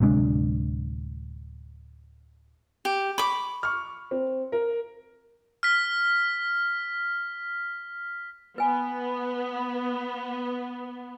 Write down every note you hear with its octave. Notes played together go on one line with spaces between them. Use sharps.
D1 C3 G#3 D4
G4
B5 C#6 D6
C#6 F6
C4
A#4
F6 B6
B3 B4 G#5